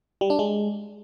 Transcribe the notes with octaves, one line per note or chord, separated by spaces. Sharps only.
G3
D4
G#3